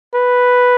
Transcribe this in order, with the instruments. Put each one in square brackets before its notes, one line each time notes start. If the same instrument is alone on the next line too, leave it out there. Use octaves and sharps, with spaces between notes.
[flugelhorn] B4